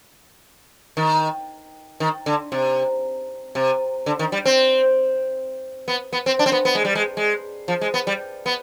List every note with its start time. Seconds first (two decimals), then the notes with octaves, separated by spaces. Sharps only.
0.97 D#3
2.00 D#3
2.26 D3
2.52 C3
3.55 C3
4.06 D3
4.19 D#3
4.32 G3
4.45 C4
5.88 B3
6.13 B3
6.26 C4
6.39 D4
6.46 C4
6.52 B3
6.65 B3
6.75 G#3
6.85 G3
6.95 G#3
7.17 G#3
7.68 F3
7.81 G#3
7.94 B3
8.07 G3
8.46 B3